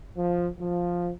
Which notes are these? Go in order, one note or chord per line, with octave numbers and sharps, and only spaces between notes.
F3
F3